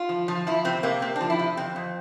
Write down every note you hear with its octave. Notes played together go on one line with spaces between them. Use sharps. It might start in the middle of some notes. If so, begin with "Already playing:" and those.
Already playing: F4
F3
F3
F3 E4
C3 C4
C3 A#3
C3 C4
F3 D4
E4
C3
F2 C4
F2